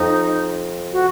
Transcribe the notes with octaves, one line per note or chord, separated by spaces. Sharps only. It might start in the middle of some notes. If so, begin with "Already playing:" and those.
Already playing: F2 D#4
F#4